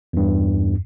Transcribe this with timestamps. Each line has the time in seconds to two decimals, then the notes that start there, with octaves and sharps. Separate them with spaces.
0.13 E2 G2